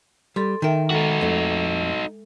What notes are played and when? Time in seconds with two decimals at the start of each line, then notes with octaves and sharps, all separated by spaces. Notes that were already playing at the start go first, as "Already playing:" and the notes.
0.36 G3 A4 C6
0.62 D#3 A#4 E5 G5
0.91 G#3 D#4 F#4 A4
1.21 F2 A3